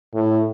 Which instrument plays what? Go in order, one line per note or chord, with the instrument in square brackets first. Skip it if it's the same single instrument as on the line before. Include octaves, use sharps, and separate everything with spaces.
[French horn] A2